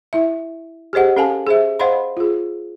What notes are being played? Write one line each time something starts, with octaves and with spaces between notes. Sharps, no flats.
E4 E5
G4 G#4 C5 D#5 F#5
C#4 A4 F5 G#5 A5
G#4 C5 E5
C5 D#5 F5 F#5 B5 C6
F4 G#4